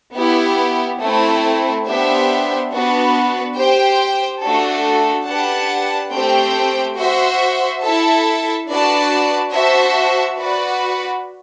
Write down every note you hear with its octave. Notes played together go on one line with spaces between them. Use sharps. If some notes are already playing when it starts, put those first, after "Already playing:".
B3 E4 G4
A3 C4 E4
B3 D4 G4 C5 E5
B3 D4 F#4 B4
G4 C5 G5
A3 D4 F#4 A4
D4 G4 B4 F#5 A5
A3 C4 G4 C5 G5
F#4 C5 E5
E4 A4 E5 A5
D4 F#4 B4 D5 A5
F#4 C5 E5 A5
F#4 B4 D5